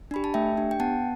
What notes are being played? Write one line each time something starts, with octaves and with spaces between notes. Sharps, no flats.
D4 G4 B5
A5
A3 E5 G5
D4 G4
G5
B3 F#5 A5